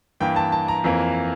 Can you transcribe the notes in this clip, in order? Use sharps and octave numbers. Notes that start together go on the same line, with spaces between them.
G2 E3 A#3 G5
A5
A5
A#5
F2 E3 A#3